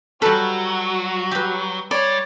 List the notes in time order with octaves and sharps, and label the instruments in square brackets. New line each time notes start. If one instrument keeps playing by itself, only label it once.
[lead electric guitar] F#3 [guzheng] G3 B4 [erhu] F#4 [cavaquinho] A4
[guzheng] G4 B4
[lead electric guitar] G3 [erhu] C#5 [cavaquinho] D5